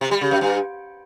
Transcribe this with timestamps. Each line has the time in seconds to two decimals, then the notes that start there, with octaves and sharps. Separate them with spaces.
0.01 C3
0.11 G3
0.21 C#3
0.31 F#2
0.41 G2